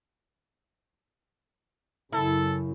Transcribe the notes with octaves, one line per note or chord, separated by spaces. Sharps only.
F#2 C#3 E4 A4